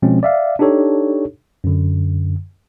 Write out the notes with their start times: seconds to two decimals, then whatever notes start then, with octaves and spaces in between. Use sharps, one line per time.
0.02 B2 F3 G#3 C4 C#4
0.23 D5 E5 F5
0.59 D4 D#4 G4 A4 C#5
1.64 F#2 D3